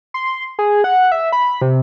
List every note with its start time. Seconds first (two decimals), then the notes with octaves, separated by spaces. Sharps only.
0.14 C6
0.59 G#4
0.84 F#5
1.12 E5
1.32 B5
1.62 C3